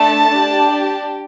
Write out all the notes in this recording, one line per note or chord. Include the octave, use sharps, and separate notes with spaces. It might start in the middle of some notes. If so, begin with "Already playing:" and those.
Already playing: A3 D4 A4 A5
D4 G4